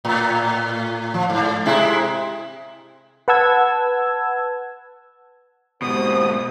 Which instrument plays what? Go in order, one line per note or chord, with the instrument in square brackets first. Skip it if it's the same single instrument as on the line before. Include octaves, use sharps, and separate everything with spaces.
[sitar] A2
F3
G#2
C3 G#3 E4
[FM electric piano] B4 F#5 A5 E6 G#6
[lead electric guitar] G#2 B2 [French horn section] C4 G4 C5 [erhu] D#6